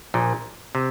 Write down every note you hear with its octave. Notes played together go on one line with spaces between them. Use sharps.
A#1 A#2
C3